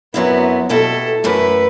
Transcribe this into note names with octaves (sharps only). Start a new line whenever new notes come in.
F#2 F#3 B3 C4 E4
B2 A3 E4 G4 A4
F#2 E3 A3 E4 B4